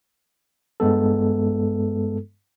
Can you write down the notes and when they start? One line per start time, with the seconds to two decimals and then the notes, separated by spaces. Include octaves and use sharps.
0.80 G2 G#3 B3 A4